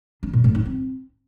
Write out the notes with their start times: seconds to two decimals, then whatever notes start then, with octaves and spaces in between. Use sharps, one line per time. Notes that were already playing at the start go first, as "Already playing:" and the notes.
0.23 D4
0.33 A#2
0.44 A2
0.55 D#4
0.65 C4